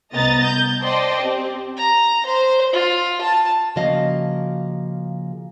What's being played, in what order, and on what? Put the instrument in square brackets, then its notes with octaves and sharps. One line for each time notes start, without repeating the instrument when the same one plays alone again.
[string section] C2 B3 D#5 A#5 A6
G6
C5 D5 D#5 G5 A5 C6
C4 G4
[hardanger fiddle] A#5
C5
F4
A5
[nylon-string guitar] C#3 F3 A#3 F#4 D#5 F5